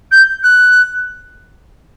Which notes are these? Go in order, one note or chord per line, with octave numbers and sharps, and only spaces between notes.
G6
F#6